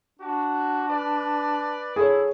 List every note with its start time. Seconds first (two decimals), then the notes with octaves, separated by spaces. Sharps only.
0.19 D4 F#4
0.88 B4 D5
1.96 E4 G#4 A4 C#5